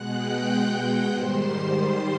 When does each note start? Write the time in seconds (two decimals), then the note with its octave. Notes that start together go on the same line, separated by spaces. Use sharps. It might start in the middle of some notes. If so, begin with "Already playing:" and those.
Already playing: B2 G#3 F#5 F#6
0.12 G5 G6
0.44 F#5 F#6
1.10 G#2 D#3 G3 C5 C6